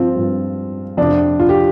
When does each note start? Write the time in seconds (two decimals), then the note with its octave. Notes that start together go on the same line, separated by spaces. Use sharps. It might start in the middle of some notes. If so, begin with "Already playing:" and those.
Already playing: G2 F3 C4 F4
0.15 G2 F3
0.97 F2 C3 F3 D4
1.40 F4
1.49 G4